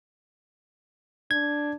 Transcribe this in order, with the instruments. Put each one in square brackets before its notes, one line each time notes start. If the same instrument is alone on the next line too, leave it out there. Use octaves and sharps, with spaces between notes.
[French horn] D4 [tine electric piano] G#6